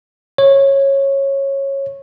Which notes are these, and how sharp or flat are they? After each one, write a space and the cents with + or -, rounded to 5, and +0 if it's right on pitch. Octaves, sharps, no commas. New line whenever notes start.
C#5 -15